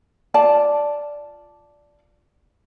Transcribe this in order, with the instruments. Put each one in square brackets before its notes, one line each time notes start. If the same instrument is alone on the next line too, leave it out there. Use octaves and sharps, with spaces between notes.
[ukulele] F4 D5 A5